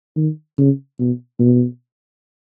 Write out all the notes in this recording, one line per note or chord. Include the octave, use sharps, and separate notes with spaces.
D#3
C#3
B2
B2